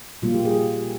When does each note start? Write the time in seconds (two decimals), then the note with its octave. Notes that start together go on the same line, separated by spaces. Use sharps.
0.22 A#2 G3 A#3 F4
0.34 G4
0.45 G#4